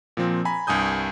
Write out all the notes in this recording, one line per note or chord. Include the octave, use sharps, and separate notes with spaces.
A#2 F3 C4
G#5 A#5 B5
C2 G2 G#5 D#6 G6